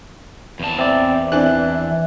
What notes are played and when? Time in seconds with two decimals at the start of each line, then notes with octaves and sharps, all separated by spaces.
0.60 E2 A5
0.79 C4 D5 E5
1.32 E3 C4 D4 F#6